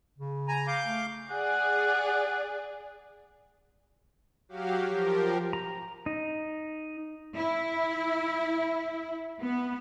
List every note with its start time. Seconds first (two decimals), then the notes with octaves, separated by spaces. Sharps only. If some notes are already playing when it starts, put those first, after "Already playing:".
0.18 C#3
0.48 G#5 A#5
0.67 F5 D6 G6
0.85 A3
1.30 G#4 D5 F#5
4.49 F#3 F#4 G4 F5
4.88 F3 G4 A#4
5.53 A#5
6.06 D#4
7.36 E4
9.40 B3